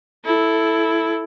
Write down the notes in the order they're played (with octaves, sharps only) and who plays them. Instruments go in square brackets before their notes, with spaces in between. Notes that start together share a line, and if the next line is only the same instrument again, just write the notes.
[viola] E4 A4